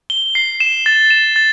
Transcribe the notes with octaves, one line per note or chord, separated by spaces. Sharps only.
G7
C7
E7
A6
E7
A6